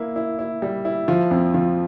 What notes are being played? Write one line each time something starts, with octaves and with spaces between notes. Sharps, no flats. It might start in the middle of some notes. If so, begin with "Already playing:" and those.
Already playing: A#3 E4
E4
E4
G3
E4
F3
F2
F3